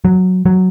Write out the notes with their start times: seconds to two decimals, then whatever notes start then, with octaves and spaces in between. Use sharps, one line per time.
0.05 F#3
0.46 F#3